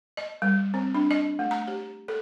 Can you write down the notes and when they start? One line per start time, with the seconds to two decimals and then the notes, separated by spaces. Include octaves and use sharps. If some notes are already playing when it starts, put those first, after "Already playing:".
0.17 D#5
0.42 G3
0.74 C4
0.95 D4
1.11 D#5
1.39 A3
1.51 A#5
1.68 G4
2.08 A4